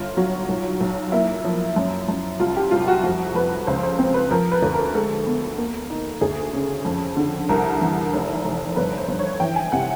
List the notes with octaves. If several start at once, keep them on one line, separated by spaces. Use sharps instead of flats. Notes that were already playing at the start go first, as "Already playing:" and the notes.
Already playing: G1 F4
F#3
B1
B1
A#3 E4
F3
F#2
F#2
C2 F4
G4
C2 F4
F#4
F2 F#4
F2 B4
C#2 C5
C5
C4
B4
F3 A#4
B4
D2
A#4
G#3 A4
B3
A#3
D#4
D2 G#4
C#3
F2
D3
C2 A#4
E3
F1
F1
G1 B4
C5
G1
C#5
E3 G5
G#5
C3 F#5